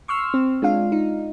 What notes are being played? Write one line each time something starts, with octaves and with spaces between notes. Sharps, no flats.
C6 C#6 E6 F6
C4
G#3 D4 F4 F5
D#4